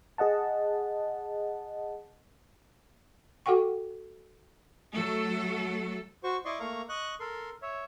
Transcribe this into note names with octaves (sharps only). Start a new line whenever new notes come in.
G#4 D#5 F#5 A5
F#4 A4 F#5 G5 C#6
F#3 A3 A4
F#4 C5 C#6
E4 D5 D#5 C6 C#6
A3 A#3 F5 A#5 C#6
D#5 C#6 F#6
A4 A#4 C6
C#5 E5